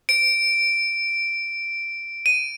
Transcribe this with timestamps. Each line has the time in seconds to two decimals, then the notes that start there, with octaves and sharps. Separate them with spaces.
0.09 D7
2.26 D#7